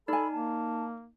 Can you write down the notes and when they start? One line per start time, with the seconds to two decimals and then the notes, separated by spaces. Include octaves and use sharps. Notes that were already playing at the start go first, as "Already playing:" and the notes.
0.08 D#4 A4 D5 G#5 B5
0.32 A#3 A5